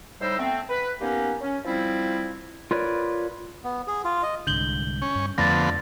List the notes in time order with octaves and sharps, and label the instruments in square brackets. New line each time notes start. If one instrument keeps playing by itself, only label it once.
[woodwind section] A2 G3 D#4 C5 E6
A3 B3 C4
B4
A#3 B3 C#4 D#4 G4
C#4
F3 G3 C4 E4
[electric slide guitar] F4 A#4 B4 C#5 D5
[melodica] B3
G#4
F4
D#5
[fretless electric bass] C2 G#2 D3 [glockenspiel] G6 F#7 G7
[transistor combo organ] C#4
[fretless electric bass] G2
[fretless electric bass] F2 A3 D4 [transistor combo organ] D3 F3 B3 [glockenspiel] A6 A#6